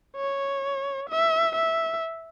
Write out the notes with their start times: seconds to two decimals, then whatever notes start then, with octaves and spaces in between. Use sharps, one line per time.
0.16 C#5
1.09 E5
1.55 E5